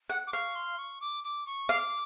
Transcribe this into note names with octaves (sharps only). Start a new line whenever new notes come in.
F#5
D6
F5 C#6
C6
C#6
D6
D6
C#6
F5 D6